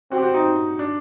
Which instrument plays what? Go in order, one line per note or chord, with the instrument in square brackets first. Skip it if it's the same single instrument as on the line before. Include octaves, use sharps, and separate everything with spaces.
[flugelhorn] C4 [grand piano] F#4
[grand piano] G4
F#4
D#4
D4